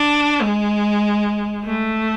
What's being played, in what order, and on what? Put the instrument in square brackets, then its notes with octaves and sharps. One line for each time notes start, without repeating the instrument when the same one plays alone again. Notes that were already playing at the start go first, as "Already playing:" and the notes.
Already playing: [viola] D4
G#3
A3